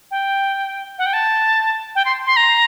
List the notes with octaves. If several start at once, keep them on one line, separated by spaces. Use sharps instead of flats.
G5
F#5
G5
A5
G5
C6
C6
A#5